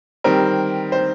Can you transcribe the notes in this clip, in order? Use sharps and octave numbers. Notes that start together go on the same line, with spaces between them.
D#3 G3 C4 A#4
C5